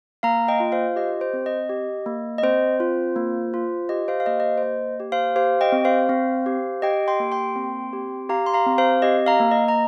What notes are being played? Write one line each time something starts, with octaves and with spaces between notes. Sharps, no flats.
A#3 F5 A#5
D#5 G5
F4
C5 F5
G4 D#5
C5
C4
D#5
G4
A#3
D#5
C4 C5
F4
A#3
F4
G4 D#5
C5 F5
F5
A#3 D#5
D#5
C5
C5
A#3 D#5
G4
C5 F5
G4 C5 F5
D#5 G5
C4
C5 F5
C4
G4
G4 D#5 G5
G5 C6
A#3
G5 C6
C4
G4
G4 F5 A#5
C6
F5 A#5
C4
C5 F5
G4 D#5
F5 A#5
A#3
D#5
A#5